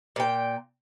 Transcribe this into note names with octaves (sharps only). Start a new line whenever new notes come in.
A#2 G5